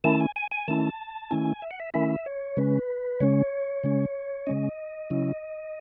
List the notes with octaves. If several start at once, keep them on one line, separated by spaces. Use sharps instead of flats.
D#3 A3 C#4 E4 A5
G#5
G#5
G#5
D#3 A3 C#4 E4 A5
D#3 A3 C#4 E4 G#5
E5
F#5
E5
D#3 A3 C#4 E4 E5
C#5
C#3 G#3 C#4 B4
C#3 G#3 C#4 C#5
C#3 G#3 C#4
C#3 G#3 C#4 D#5
C#3 F#3 C#4 E4